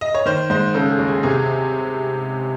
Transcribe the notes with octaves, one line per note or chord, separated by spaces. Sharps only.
D#5
C#5
D#3 C5
G#2 C5
C#3 A4
G#4
D#2
G#4
C3 G#4